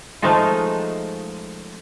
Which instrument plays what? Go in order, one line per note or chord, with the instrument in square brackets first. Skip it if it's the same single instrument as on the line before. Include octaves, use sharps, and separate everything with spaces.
[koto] F3 G#3 A3 D#4 F4